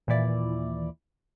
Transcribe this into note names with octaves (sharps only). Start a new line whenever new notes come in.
D#2 A#2 E3 E4 D5